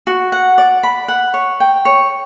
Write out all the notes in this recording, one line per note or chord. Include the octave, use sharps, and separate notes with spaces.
F#4
F#5
D5
B5
F#5
C#5
G5
C#5